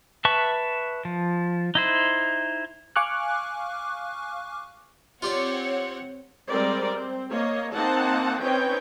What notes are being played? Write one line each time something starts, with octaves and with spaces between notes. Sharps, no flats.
B4 E5 A5 C#6
F3
D#4 E4 C5
F5 G#5 C#6 D6 F6 F#6
C4 F4 G4 C#5 D5 F#5
G3 G#3 C4 A#4 D5
C4
A#3 C#5 D#5
A#3 C4 D#4 F#5 A5
C4 C#4 D#4 B4 C#5 G5